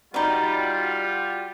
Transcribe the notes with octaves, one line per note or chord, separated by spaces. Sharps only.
G3 D#4 F4 F#4 D5